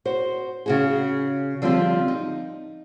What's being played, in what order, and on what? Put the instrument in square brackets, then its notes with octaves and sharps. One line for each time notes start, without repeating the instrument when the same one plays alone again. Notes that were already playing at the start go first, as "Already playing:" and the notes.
[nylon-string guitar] F#4 C5
C#3 F#4 G#4
D3 F3 G3 C4 F4 G4
D#4